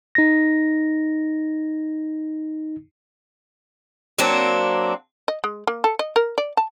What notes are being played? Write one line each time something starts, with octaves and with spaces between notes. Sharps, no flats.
D#4 A#6
F#3 A#3 C4 D4
D#5
G#3
A#3
A4
D#5
A#4
D5
A5